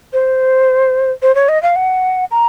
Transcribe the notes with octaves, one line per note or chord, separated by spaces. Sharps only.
C5
C5
C#5
D#5
F5
F#5
A#5